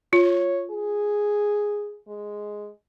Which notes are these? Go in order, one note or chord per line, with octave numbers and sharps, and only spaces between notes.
F4 C#5
G#4
G#3